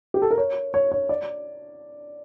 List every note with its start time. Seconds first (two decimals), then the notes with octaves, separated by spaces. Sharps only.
0.14 G4
0.22 A4
0.31 A#4
0.38 C#5
0.74 C#5
0.92 C#5
1.09 D5